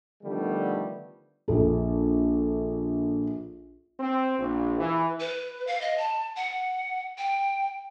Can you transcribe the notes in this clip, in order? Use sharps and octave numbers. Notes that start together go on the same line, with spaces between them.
D3 D#3 F3 G3 A3 B3
A#1 A4
C4
A#1
E3
B4
F5
D#5
A5
F#5
G5